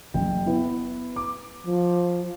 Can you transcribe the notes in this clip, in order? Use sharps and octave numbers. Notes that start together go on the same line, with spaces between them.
F#1 G5
B3 E4
D6
F3